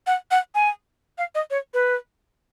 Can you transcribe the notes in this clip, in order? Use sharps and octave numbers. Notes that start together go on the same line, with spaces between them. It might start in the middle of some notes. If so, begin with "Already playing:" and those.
F#5
F#5
G#5
F5
D#5
C#5
B4